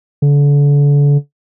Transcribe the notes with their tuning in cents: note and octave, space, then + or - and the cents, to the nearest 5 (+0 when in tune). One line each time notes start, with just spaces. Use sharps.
D3 -35